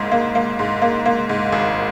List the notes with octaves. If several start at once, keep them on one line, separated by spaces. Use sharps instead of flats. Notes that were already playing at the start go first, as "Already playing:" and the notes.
Already playing: G#1 G#2 A#3
A#3
A#3
G#2
A#3
A#3
G#2
G#1